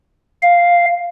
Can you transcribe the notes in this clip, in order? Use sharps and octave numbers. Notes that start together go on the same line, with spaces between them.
F5